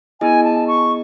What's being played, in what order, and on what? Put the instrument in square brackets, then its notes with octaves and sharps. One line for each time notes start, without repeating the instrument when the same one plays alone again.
[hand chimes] B3 E4 G#4 D#5 [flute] G#5
[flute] A5
C#6